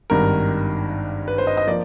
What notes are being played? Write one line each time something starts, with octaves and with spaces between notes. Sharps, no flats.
G#1 G2 D#3 A#4
B4
C5
D#5
D#5
F3 A#3 D5